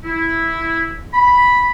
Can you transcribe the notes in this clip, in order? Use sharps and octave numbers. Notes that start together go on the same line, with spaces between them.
E4
B5